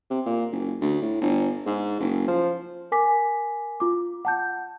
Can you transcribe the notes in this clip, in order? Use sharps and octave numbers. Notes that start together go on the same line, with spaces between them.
C3
A#2
F#1
D2
A2
G1
G#2
F#1
F3
A#4 G#5 D6 B6
F4 D6
F#5 A5 G6